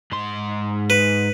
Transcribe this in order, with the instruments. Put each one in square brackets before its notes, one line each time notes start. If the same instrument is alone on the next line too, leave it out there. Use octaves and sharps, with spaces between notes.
[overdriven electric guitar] G#2 C6
[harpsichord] B4